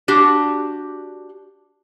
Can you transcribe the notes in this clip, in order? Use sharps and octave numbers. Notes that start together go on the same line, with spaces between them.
D4 F#4 G4